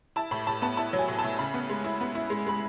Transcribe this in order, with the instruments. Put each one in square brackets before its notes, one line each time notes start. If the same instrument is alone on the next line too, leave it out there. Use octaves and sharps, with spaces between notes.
[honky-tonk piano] E4 A5
A2 B5
A2 A5
B3 A5
E4 A5
F#3
G#5
A2
A5
A2
C#3 B5
B3
G#3
E4
B3
E4
G#3
G#3 B5